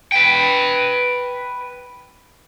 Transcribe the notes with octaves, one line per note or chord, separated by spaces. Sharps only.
B4 G5